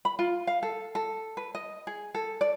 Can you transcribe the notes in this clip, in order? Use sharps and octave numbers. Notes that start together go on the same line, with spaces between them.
B5
F4
F5
A4
A4
B4
D#5
G#4
A4
D5